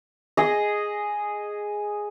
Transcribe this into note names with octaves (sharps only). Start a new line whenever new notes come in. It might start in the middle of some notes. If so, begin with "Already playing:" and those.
G#4 D#5